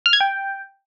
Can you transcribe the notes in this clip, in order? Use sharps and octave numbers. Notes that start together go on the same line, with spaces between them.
F6
G#6
G5